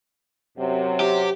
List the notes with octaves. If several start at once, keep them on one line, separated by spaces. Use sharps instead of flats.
F#2 C3 F#3
G4